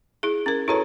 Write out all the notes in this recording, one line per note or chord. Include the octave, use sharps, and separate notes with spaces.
E4 G#4
C#4 A#4
E4 F#4 A4 B4 C#5 A#5